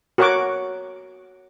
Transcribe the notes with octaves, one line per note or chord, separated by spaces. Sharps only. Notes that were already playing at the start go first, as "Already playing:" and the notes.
F#4 A#4 C#5 F#5 C#6 D6